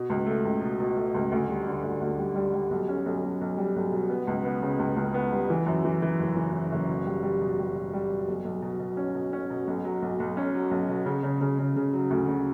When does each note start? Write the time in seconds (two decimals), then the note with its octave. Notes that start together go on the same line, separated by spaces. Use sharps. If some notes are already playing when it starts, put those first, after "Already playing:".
Already playing: B2
0.10 C#2
0.26 A3
0.45 C#2
0.61 B2
0.80 B2
0.96 A3
1.15 C#2
1.32 D2
1.48 G3
1.67 D3
1.83 D2
2.01 D2
2.18 G3
2.35 G3
2.54 G3
2.70 B1
2.89 C#4
3.06 B1
3.23 B1
3.41 B1
3.57 G3
3.76 B1
3.92 B2
4.10 B3
4.27 C#2
4.45 B3
4.62 C#3
4.79 C#2
4.97 C#2
5.14 B3
5.32 G3
5.50 E3
5.66 F#2
5.85 E3
6.02 E3
6.20 F#1
6.37 E3
6.53 E3
6.72 F#1
6.88 B2
7.06 G3
7.23 G3
7.41 B2
7.59 G3
7.75 B2
7.93 G3
8.11 B2
8.28 B1
8.45 B1
8.62 B2
8.80 B2
8.97 C#4
9.15 B2
9.33 C#4
9.50 B2
9.67 B1
9.84 F#3
10.02 B1
10.20 B1
10.37 C#4
10.55 F#3
10.71 B1
10.89 B2
11.06 C#3
11.23 C#3
11.41 C#3
11.59 C#3
11.76 C#3
11.93 F#3
12.11 D2
12.28 C#3